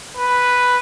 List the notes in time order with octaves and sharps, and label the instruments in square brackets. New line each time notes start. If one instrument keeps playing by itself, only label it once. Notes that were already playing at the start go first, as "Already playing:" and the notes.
[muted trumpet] B4